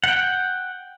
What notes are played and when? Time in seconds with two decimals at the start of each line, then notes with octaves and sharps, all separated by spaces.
0.04 F#5 G5